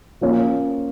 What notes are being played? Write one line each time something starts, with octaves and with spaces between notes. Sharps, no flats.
F3 A#3 C#4 F4